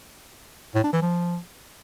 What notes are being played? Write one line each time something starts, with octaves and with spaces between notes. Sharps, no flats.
A2
D4
E3
F3